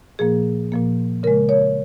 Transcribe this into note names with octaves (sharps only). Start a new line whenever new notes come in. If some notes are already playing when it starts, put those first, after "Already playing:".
A#2 F3 A#3 G#4
A#2 F3 A#3
C#3 G#3 A#4
C#5